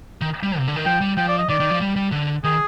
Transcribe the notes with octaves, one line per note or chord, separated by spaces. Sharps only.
D#3
G3
C3
D3
D#3
F3 G5
G3
F3 G5
D5
D#5
D#3 D5
D#3
F3
G3
G3
D3
D#3 G#4